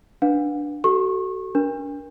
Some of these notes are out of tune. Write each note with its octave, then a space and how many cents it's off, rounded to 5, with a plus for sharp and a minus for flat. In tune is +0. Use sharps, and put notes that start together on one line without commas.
D4 +0 B4 -15 F#5 -45
F#4 +35 A4 +0 C#6 -30
D4 -30 A#4 +25